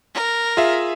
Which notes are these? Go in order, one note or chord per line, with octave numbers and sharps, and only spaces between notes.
A#4
F4 G#4 E5